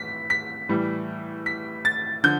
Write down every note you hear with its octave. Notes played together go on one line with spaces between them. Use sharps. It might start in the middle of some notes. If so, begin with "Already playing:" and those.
Already playing: A2 E3 B6
B6
A2 E3 G3
B6
A6
D3 F3 G6